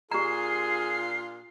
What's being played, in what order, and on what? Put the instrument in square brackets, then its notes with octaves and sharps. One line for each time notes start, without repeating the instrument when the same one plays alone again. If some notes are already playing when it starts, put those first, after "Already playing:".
[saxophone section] A#2 D4 F4 [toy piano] G4 A#5 [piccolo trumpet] G#4 [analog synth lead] C7